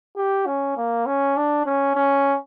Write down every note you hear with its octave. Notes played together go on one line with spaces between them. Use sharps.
G4
C#4
A#3
C#4
D4
C#4
C#4